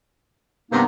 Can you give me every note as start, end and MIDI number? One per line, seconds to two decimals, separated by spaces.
0.72 0.81 43
0.72 0.81 48
0.72 0.86 58
0.72 0.86 59
0.72 0.86 63